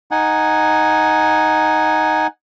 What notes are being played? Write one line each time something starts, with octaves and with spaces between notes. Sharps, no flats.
D#4 F#5 G#5